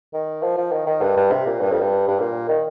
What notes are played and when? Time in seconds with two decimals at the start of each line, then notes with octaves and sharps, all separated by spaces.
0.14 D#3
0.43 F3
0.58 F3
0.72 D#3
0.87 D#3
1.02 G2
1.17 G2
1.32 C3
1.46 A#2
1.60 G2
1.71 F2
1.81 G2
2.08 G2
2.20 A#2
2.49 D#3